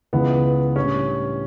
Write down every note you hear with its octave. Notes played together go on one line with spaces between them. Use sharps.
C#2 C#3 E3 B3
A2 G3 C#4 D4